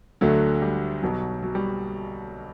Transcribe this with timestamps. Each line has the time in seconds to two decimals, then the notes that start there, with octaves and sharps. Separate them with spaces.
0.21 D2 D3 F#3 A3
0.62 G3
1.02 B1 B2 F#3
1.42 F#3
1.55 G3